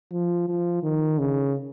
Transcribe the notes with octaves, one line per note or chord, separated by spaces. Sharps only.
F3
F3
D#3
C#3